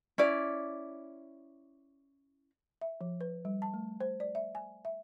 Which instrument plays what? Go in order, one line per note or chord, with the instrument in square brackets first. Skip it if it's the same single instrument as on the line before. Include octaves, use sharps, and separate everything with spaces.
[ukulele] C#4 E4 D5
[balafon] E5
F3
B4
G3
A5
A3
C5
D5
E5
G#5
E5